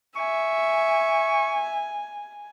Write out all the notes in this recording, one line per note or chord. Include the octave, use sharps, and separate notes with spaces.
E5 G#5 C#6